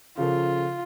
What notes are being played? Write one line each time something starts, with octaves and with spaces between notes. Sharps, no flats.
C#3 F3 F4 A4